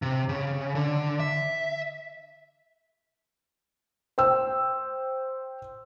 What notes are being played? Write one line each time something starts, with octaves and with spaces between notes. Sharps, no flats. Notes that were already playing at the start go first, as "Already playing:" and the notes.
C3
C#3
D3
E5
C5 G5 E6